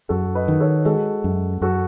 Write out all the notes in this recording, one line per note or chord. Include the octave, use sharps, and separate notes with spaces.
F#2 F#4 A4
B4 D#5
D#3
A4 C#5
G#3 F#4 A4
F#2
F#2 F#4 A4